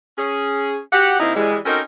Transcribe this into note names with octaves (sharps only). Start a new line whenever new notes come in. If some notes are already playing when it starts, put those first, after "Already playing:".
C#4 G#4
F#4 G4 F#5
C3 A#3 C4 D#4 E4
E3 G3 G#3
C4 C#4 D#4 F#4 A4 A#4